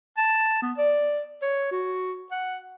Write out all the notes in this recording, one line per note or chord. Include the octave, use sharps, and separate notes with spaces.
A5
B3
D5
C#5
F#4
F#5